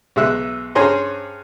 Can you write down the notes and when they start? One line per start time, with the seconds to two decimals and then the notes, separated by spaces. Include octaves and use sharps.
0.16 B1 G#3 E5 F#6
0.75 G2 C#4 G#4 C5 A#5 C6